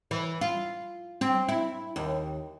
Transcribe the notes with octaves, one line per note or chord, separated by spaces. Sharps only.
E3
F4
C4
E4
D#2